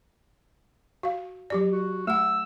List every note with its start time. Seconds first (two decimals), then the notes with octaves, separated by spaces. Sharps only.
1.03 F#4 F5
1.50 F#3 G4 D5
1.72 F#4
2.07 A3 F#5 E6